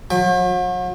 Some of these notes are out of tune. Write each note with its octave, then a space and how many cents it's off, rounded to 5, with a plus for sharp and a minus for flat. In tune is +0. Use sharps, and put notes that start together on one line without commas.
F#3 -40 G5 +40